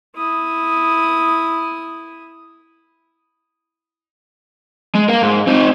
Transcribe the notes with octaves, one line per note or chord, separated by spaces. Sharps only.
E4 D#6
G#3
A#4 F5
G#2
C4 D#4